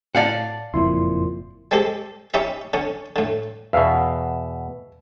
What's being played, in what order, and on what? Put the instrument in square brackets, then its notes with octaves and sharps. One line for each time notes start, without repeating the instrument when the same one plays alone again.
[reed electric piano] A2 A5 [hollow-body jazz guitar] D5 F5 F#5
[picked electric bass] F#1 F2 A#2 [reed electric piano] E4 C6
[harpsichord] G3 G#3 C4 G4 A4
C#4 D#4 E4 G4 E5
D3 C#4
A2 D3
[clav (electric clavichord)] E2 B2 [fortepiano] E5 F5